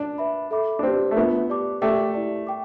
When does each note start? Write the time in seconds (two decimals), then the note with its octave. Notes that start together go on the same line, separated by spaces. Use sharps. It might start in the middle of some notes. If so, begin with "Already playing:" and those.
Already playing: D4
0.18 B4 E5 B5
0.51 A4 E5 B5 D6
0.79 D4
0.83 C4 G4 B4 D5
1.11 A3
1.16 B3 D4 F4 B4 E5 A5
1.49 G4 D5 A5 D6
1.81 A3 G4 D5 G5 D6
2.14 E4 G4 D5 A5
2.47 G5 D6